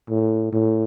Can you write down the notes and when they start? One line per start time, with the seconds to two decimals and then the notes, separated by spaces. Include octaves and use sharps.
0.09 A2
0.53 A2